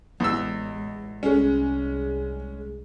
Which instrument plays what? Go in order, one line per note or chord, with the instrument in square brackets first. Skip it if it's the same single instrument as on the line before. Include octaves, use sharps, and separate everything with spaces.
[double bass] A1 G#3 [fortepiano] E2 E6
[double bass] C2 [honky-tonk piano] G#3 C#4